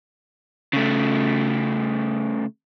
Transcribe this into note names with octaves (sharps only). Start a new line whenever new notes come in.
C#3 A3